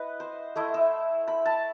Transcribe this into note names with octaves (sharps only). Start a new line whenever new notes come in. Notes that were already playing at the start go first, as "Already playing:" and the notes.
Already playing: E4 B4 D#5 F#5
C5
A3 E4 D#5
E5
B5
A5